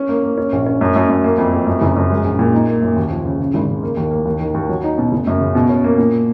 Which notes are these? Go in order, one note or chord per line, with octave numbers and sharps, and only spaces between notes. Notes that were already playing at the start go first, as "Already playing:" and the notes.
Already playing: C#4
A#3
A#3
C#4
A#1
C#4
F#2
F#2
F#2
A#3
F2
F2
F#2
F#1
F#2
G#3
A#1
A#2
D#4
A#3
F#2
D#2
F3
C#3
C#3
G#1
C#3
A#3
D#2
A#3
D#2
D#3
D#2
F#3
D#4
B2
F#1
F#2
C#3
B2
C#4
A#3
A#2